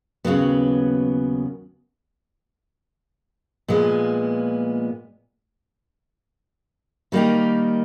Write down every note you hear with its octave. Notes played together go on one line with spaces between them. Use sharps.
D#2 C#3 F#3 B3
A#2 F3 G#3 B3
D#3 G3 A#3 D#4 G4